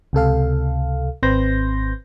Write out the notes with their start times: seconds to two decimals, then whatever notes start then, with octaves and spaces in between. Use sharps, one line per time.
0.13 C#2 C3 A4 F5
1.23 G#1 C4 B4 C6 G6 A#6